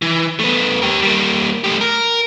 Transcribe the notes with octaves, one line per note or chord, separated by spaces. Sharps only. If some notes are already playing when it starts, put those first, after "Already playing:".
E3
A3 B3
G4 A#4
G3 A#3
A3 G4
A#4